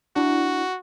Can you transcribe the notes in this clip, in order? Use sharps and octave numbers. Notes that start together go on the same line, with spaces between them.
D4 E4 F#4